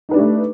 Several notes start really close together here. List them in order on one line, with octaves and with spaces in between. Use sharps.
D#4 B4 D4 G4 A3